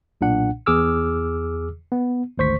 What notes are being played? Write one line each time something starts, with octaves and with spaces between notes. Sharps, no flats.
B1 A#2 D4 F#5
E2 G#4 D6 E6 F6
B3
G#1 D2 C5 C#6 B6